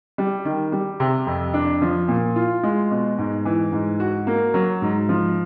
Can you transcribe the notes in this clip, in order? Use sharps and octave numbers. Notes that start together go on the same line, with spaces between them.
G3
D#3
G3
C3
F2
D4
F3
A#2
F4
G#3
B2
G#2
E3
G#2
F#4
A#3
F#3
G#2
F3